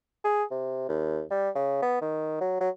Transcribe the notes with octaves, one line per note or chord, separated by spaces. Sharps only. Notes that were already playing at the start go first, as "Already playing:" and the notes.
G#4
C3
D#2
G3
C#3
B3
D#3
F#3
F#3